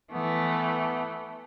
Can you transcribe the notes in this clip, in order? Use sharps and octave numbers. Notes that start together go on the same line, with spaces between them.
E3 A3 B3